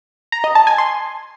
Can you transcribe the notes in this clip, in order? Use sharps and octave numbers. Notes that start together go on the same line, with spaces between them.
A#5
D#5
A5
G#5
C6